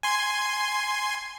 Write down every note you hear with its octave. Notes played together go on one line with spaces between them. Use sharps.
G#5 C6